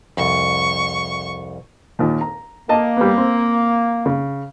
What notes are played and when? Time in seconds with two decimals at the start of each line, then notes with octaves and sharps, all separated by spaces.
0.17 C2 F2 C#6
1.99 D#2 A#2
2.21 A#5
2.69 A#3 D#5 A5
2.97 G3 B3
3.18 C4
4.06 C#3